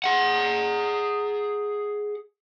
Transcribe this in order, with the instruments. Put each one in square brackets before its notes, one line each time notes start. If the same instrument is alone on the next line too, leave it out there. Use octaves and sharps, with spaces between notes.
[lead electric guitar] G#4 F#5